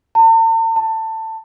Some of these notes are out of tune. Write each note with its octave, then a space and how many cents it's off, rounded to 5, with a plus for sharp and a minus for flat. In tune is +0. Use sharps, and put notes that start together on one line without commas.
A5 +45
A5 +20